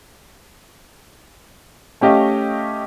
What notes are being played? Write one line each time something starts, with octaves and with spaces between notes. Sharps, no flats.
A3 C#4 G4 D#5 F5